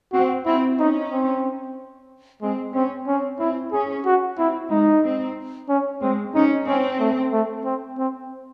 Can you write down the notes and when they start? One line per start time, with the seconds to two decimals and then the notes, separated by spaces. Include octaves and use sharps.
0.13 C4 F#4
0.45 C4 E4
0.79 C#4 D#4
1.11 C4
2.42 G#3 C4
2.74 C4 C#4
3.07 C4 C#4
3.40 C4 E4
3.72 C#4 G#4
4.06 F#4
4.38 C4 E4
4.70 G#3 D#4
5.04 C4
5.69 C#4
6.01 G#3 C4
6.34 C#4 D#4
6.67 C4 C#4
7.00 A3
7.33 A3
7.65 C4
7.98 C4